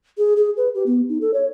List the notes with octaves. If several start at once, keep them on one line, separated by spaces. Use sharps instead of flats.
G#4
G#4
B4
G4
B3
D#4
A4
C#5